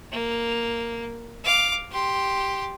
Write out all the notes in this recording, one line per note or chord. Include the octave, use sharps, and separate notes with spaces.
A#3
F5 D6
G4 C6